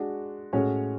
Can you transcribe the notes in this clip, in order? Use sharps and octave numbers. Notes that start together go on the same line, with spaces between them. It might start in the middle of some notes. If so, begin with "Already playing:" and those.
Already playing: G#3 D4 F#4
A2 G#3 C#4 F#4 C#5